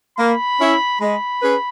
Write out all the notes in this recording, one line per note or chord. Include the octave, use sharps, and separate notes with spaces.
A#3 B5
C#4 E4
G#3 B5
C#4 G#4 B4